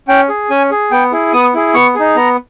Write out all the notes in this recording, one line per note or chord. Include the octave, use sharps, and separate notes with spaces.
C#4 G5
G#4
C#4 G#5
G#4
B3 G5
E4 G#4
B3 D#6
E4 G#4
B3 C#6
D#4 G#4
B3 A#5